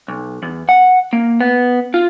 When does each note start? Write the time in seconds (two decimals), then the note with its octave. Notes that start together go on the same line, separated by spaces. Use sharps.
0.08 B1
0.43 E2
0.69 F#5
1.13 A#3
1.41 B3
1.94 F4